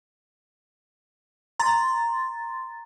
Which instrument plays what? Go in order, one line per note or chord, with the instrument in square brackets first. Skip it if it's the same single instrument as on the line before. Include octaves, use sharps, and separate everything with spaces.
[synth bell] A#5 C6 A6